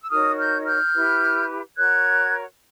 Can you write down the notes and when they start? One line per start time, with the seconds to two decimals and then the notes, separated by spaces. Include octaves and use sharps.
0.02 E6
0.11 D#4 F#4 A#4 C#5 D#6 F6
0.38 F6 G6
0.66 F6 G6
0.94 E4 G4 B4
1.77 F#4 A#4 C#5 F#6 G#6